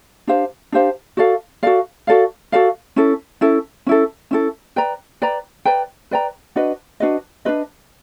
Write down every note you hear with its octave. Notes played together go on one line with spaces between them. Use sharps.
D4 G4 C5 F5
D4 G4 C5 F5
F#4 A4 D5 F5
F#4 A4 D5 F5
F#4 A4 D5 F5
F#4 A4 D5 F5
C#4 E4 A4
C#4 E4 A4
C#4 E4 A4
C#4 E4 A4
B4 D5 G5 A#5
B4 D5 G5 A#5
B4 D5 G5 A#5
B4 D5 G5 A#5
D4 F#4 B4 D#5
D4 F#4 B4 D#5
D4 F#4 B4 D#5